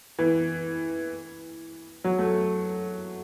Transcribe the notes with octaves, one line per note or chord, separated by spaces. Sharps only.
E3
F#3
A3